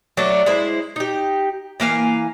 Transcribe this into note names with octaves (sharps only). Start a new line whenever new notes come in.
F#3 A3 D4
G#3 E4 C5
D#4 G4
E3 A#3 F5 G#5